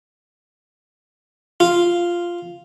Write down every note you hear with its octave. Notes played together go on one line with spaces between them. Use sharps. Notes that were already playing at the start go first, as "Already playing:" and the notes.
F4